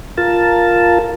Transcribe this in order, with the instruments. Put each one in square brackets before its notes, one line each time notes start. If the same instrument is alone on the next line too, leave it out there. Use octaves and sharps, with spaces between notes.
[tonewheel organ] F4 A#4 A5